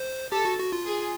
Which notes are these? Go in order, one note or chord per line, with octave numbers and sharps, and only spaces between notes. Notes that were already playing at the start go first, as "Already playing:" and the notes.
Already playing: C5
G4 A4
F#4
F#4
F4
G#4